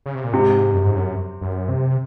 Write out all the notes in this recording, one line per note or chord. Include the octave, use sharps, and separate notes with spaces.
C#3
C3
A#2
G#2 C3
F#2
G#2
F#2
F#2
C3